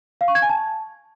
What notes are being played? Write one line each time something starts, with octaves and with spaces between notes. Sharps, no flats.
F5
C#6
G#6
G#5
A5